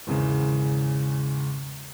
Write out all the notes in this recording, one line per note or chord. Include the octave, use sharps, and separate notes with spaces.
G#1 E2 C#3